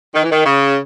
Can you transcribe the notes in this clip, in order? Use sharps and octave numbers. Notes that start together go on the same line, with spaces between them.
D#3
E3
D#3
C#3